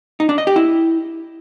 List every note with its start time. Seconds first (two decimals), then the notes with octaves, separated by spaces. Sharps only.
0.20 D#4
0.29 D4
0.38 D#5
0.47 G4
0.56 E4